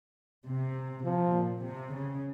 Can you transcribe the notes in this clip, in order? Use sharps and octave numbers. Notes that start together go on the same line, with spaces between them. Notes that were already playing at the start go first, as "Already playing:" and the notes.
C3
C3 F3
A#2
C3
C#3